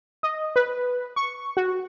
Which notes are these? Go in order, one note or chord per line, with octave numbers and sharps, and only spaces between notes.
D#5
B4
C#6
F#4